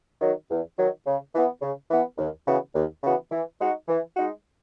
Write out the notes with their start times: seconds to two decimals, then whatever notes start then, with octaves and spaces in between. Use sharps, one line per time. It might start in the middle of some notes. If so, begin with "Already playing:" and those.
0.21 D#3 F#3
0.50 E2
0.78 D#3 F#3
1.07 C#3
1.35 E3 B3
1.62 C#3
1.91 E3 B3
2.18 D#2
2.47 C#3 E3 B3 F#4
2.75 D#2
3.03 C#3 E3 B3 F#4
3.32 E3
3.60 G#3 D#4 F#4
3.88 E3
4.16 G#3 D#4 F#4